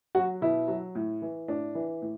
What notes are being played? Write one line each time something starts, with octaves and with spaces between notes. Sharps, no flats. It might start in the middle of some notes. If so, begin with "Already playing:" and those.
F#3 F#4
B2 E4
F#3
A2
E3
A2 D4
E3
A2